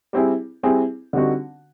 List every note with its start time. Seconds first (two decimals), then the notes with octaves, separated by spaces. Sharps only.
0.13 G3 C4 E4 G#4
0.63 G3 C4 E4 G#4
1.13 D3 G3 C4 D#4 F#4